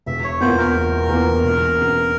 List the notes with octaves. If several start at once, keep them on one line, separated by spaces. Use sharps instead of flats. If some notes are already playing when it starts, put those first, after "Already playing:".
E1 E5
C#5
E2 E3 A#3 F4 C5
A#4
E1
E2 E3 A#3 F4
E1
E2 C#3